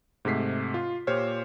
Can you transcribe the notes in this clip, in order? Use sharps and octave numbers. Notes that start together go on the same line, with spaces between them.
G#2 C3 A3 B6 C7
F4
A#2 G4 C5 C#5 F6